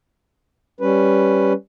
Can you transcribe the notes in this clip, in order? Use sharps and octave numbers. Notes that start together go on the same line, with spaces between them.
G3 C#4 B4